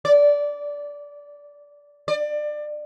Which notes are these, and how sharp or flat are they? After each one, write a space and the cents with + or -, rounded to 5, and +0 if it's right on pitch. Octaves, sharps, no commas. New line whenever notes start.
D5 -15
D5 +25